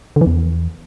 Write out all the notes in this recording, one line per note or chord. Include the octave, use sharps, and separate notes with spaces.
D3
E3
E2